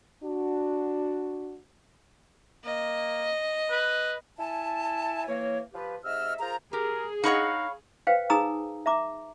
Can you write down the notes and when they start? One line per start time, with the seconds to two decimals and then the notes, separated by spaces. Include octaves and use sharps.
0.24 D4 F#4
2.65 A#3 D#5
3.71 B4
4.38 E4 G#5 A5
5.27 E3 A#3 C#5
5.73 F3 F4 G4 B4
6.04 G#2 C3 D#5 E5 E6 F6
6.39 F4 G#4 A#4 C5 A#5
6.73 G4 G#4 A#4
7.24 D#4 C#5 D#5 F5 F#5 B5 C#6
8.07 B4 C5 F5 G5
8.30 D#4 G#4 G#5 A#5 D#6 E6
8.86 E5 A#5 D6